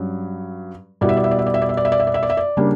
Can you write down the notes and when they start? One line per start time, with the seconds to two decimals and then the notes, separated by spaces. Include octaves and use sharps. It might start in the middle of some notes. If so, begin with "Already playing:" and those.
Already playing: G2 F#3 C#4
1.01 B2 G3 B3 E4 D5
1.09 E5
1.17 D5
1.24 E5
1.31 D5
1.39 E5
1.46 D5
1.54 E5
1.62 D5
1.69 E5
1.77 D5
1.85 E5
1.92 D5
2.00 E5
2.07 D5
2.14 E5
2.23 D5
2.30 E5
2.37 D5
2.57 C#3 G3 A#3 D4